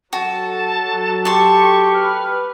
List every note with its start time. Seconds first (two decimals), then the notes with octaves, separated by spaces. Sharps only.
0.13 F#3 F#4 A4 A5
1.25 G4 A5 C6 C#6
1.94 B4 F6